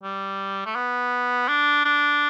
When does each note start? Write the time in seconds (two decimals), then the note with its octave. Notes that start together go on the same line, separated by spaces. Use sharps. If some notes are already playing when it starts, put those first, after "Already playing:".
0.03 G3
0.66 A3
0.76 B3
1.48 D4
1.85 D4